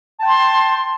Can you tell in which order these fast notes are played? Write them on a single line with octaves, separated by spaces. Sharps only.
A5 G5 C6